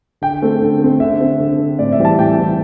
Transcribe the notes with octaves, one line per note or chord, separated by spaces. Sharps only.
D3 G5
A3 C4
D3
A3 C4
D3 E5
C4
D3
C4
A2 D5
E5
E3 G3 C4
A5
A2 G5
E3 G3 C4